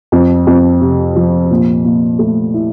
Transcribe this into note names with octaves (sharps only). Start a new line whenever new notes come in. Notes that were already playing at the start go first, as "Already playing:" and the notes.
F2
F2
C3
F3
A#2
A#2
A3
E4